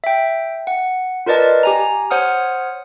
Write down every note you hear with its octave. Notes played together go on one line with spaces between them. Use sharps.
E5 G5
F#5
F4 A#4 B4 D5 D#5 A5
G4 G#5 A#5
C5 C#5 F#5 D#6 F6